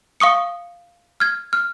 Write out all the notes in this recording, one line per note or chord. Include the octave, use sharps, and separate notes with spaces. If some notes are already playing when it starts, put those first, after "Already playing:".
F5 C#6 D#6 C#7
F6 G#6
F6